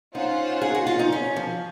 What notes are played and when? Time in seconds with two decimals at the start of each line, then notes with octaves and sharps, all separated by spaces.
0.15 C#4 D#4 F4 C5 F#5
0.62 G#4
0.75 F#4
0.87 F4
0.99 D#4
1.12 C#4
1.36 F3